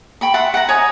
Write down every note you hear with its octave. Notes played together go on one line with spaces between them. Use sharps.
G5 B5 C#6
E5 F#5 A5 C6
F#5 A5 A#5
C#5 D#5 G#5